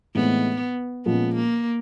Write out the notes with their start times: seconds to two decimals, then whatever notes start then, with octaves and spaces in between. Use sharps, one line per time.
0.15 A2 E3 G#3 B3 C4 D#4
1.06 A#2 F3 G#3 B3 C#4
1.35 A#3